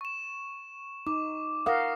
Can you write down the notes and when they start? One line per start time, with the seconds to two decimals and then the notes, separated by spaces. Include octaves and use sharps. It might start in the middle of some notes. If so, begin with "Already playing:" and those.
0.01 C#6 E7
1.07 D#4 D6
1.66 A#4 F5 F#5 D#6 F6 A#6